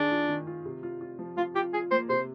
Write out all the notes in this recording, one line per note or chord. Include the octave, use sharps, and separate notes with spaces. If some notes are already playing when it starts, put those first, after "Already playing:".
Already playing: D#3 D4 G#4
F4
D#3
F4
C3
F4
F4
F3
F3 F4
F4 G4
F4 G#4
A#3 C5
C3 C5